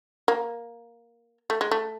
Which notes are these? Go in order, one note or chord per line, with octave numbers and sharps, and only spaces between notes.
A#3
A3
G#3
A3